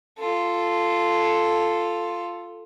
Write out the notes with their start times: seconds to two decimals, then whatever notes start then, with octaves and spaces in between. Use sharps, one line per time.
0.19 F4 A4